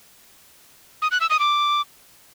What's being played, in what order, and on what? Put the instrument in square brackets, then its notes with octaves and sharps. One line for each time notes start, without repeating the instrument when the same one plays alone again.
[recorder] D#6
F#6
E6
D#6
D6